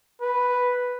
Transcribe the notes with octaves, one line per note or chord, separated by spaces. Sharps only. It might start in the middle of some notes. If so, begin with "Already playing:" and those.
B4